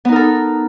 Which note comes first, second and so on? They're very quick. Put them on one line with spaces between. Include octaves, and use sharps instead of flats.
B3 D#4 A#4 A4